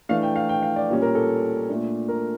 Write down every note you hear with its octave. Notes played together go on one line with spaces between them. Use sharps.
E3 A3 D4 F5
G5
F5
G5
F5
D5
A#2 G3 C#4
A#4
A4
A#2 A3 D4
A#4